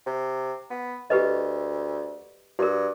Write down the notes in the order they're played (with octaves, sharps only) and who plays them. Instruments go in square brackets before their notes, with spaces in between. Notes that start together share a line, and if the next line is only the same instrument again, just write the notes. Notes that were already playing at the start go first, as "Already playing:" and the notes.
[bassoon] C3
B3
[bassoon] D2 [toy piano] G4 B4 D#5
[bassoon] G2 [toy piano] F#4 A#4